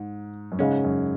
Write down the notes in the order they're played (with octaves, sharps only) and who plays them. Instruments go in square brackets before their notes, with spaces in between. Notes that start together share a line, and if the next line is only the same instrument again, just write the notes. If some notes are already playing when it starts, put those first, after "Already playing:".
Already playing: [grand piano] G#2
F#2
[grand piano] G#2 [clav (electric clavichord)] C#3 G#3 C#4
[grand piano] F#2